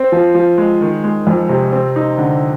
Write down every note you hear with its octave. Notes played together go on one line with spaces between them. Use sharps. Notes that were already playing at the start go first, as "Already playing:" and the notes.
Already playing: C4
F3
F3
G#3
D#3
G#3
F2
C3
C4
D#4
D3